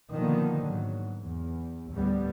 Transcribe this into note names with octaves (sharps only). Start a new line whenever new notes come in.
B2 D3 D#3 F3 A#3 B3
G#2 F#3
E2
D2 A2 G3 B3